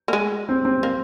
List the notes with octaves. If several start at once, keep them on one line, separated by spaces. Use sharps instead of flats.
A#3
G#3
C4
C4
A#3